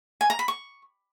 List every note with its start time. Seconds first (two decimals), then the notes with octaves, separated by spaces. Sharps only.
0.21 G#5
0.30 A#5
0.39 B5
0.48 C#6